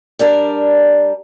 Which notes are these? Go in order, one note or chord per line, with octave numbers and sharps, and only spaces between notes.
G3 D4 A#4